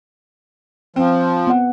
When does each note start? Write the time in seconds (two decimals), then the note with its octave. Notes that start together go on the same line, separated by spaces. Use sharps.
0.96 F3 C4
1.47 B3 F#5